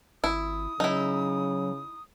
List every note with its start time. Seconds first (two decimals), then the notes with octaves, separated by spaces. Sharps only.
0.24 G#1 E4 D#6
0.80 C#3 F#3 D#4 E4